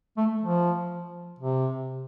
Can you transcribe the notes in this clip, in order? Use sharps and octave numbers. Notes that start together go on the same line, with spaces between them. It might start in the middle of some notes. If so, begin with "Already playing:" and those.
A3
F3
C3